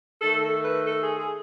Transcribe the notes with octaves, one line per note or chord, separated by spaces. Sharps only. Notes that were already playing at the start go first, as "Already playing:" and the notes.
D#3 A3 A4
A4
B4
A4
G#4
G#4